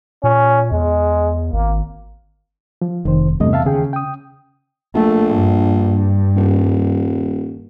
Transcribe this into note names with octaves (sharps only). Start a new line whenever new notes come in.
A#2 C#4
E2 G#3
G#1 A#3
F3
F1 D#3 C5
E2 G2 C3 A3 D#5
E5 F5 A5
D#2 C#3 G#4 G5
G5 D#6
A#1 A3
G2
D#1